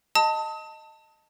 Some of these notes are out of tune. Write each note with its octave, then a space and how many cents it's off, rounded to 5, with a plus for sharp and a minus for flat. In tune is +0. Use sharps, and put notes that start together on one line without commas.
D#5 +0 A5 +20 D#6 +40